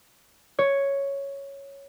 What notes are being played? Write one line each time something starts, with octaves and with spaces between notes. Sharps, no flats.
C#5